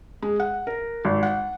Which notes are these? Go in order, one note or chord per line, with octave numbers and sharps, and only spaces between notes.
G#3
F#5
A#4
G#1
F#5